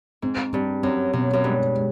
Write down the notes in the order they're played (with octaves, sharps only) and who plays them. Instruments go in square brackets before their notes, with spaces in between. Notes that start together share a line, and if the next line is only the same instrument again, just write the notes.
[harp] G#2 [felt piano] C4
[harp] G2 [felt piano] C4
[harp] F#2 [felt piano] C4
[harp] F#2 [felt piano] B2
[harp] F#2
[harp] G2 [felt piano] G#3
[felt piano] G#3